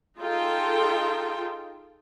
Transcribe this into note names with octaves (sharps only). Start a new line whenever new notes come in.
D#4 F4 G#4 A4 G5